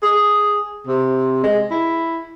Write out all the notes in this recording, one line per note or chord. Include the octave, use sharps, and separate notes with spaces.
G#4
C3
G#3
E4